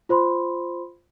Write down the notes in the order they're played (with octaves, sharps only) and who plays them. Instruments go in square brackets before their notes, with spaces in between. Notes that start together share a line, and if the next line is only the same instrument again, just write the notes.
[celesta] F4 C5 B5 C6